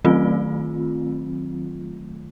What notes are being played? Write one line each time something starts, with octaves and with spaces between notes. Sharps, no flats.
D#3 F#3 A3 C4 F4